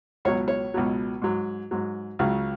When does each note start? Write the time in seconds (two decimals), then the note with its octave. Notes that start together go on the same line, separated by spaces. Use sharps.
0.25 C#2 B2 F#3 C#5
0.48 C#5
0.74 C#2 B2 F#3
1.22 G#2 F#3
1.71 G#2 F#3
2.19 C#2 C#3 F#3